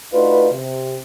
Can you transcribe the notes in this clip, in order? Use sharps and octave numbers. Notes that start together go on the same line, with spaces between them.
A3 D4 D#4 F4 F#4 B4
C3